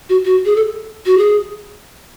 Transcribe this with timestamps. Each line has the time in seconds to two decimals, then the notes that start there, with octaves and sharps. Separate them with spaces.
0.09 F#4
0.25 F#4
0.45 G#4
0.56 A4
1.06 F#4
1.18 G#4